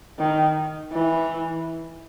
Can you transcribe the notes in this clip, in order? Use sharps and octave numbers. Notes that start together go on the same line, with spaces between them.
D#3
E3